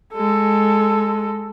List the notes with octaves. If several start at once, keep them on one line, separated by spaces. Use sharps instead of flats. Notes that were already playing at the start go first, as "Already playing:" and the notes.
G#3 A4